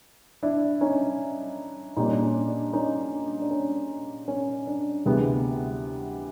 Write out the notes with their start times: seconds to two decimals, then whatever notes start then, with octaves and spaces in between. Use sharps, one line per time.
0.43 D4 E4
0.81 C#4 D#4
1.96 A#2 G3 A#3 C#4 D#4
2.12 D4
2.23 C#4
2.49 D4
2.73 C#4 D#4
3.12 D4
3.42 D4
3.51 C#4
4.28 C#4
4.67 D4
5.06 D2 C3 E3 G#3 B3